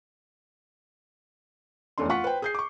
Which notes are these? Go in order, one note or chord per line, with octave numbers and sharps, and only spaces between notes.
F1 E2 A3 C#4 D4 C6
F4 F#5 C#6 B6
B4 C5 G5
G#4 G6 C7
C#6 D6